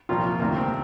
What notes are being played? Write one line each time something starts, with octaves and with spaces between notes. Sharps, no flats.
C2 A#2 F3 F4
D2 C3 D#3 A#3
C4